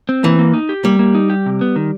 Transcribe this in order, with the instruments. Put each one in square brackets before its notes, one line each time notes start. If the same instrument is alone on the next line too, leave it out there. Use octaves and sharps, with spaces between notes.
[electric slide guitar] C4
[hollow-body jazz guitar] E3 [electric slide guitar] A#3
[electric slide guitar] A#3
D#4
G4
[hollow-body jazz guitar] G3 [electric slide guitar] A#3
[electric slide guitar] A#3
D#4
G4
C3
B3
D#3